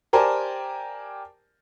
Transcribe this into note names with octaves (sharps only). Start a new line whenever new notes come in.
G4 A#4 C5 D5 G#5 A5